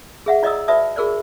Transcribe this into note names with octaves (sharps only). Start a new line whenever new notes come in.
G#4 E5 F#5
F4 D5 D#5 A#5 D#6 E6
F#4 B4 D5 E5 A5 D#6
F#4 G#4 A#4 C5 D5